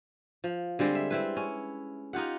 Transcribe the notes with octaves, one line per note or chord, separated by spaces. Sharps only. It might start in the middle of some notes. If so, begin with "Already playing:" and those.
F3
D3 G3 G#3 C4
E5
C4 E4 B4
C#4
D#4 F4 G4 F#5